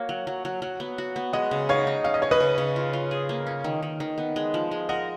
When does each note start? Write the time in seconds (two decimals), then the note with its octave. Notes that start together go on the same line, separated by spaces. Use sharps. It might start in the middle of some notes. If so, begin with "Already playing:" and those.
Already playing: A#3 F#4 C#5
0.09 F#3
0.27 F#3
0.45 F#3
0.62 F#3
0.80 B3
0.98 F#4
1.16 B3
1.33 G#3 D#5 F#5
1.51 C#3
1.69 D#4 C#5 F5
1.87 D#4
2.04 C#4 F5
2.14 D#5
2.22 C#4 C#5
2.31 B4 D#5
2.40 C#3
2.58 C#3
2.76 F4
2.93 F4
3.11 G#4
3.29 A#3
3.47 C#4
3.64 D#3
3.83 D#3
4.00 D#3
4.18 B3
4.36 G#3
4.54 F3
4.71 G#3
4.89 A#4 D#5 F#5